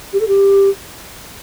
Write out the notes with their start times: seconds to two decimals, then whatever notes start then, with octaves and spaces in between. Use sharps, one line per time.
0.13 G4
0.20 A4
0.27 G4